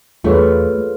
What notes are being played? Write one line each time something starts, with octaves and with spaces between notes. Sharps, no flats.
E2 A3 F4 G#4 B4 C#5